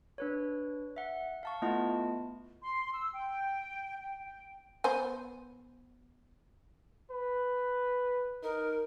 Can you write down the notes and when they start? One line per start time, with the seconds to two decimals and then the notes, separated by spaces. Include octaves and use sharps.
0.18 D4 B4 C#5
0.96 E5 F#5
1.43 F5 A5 C#6
1.62 A3 B3 E4 F4 D#5 A5
2.62 C6
2.93 E6
3.12 G5
3.97 G5
4.84 B3 C5 G#5
7.11 B4
8.43 D#4 A#4